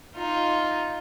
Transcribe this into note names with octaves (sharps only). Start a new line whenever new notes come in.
D#4 F4